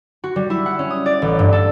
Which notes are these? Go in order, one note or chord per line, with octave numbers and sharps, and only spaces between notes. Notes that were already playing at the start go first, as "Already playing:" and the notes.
F#4
G3
E4
F#5
C#4
D#6
D5
A1
G2
A4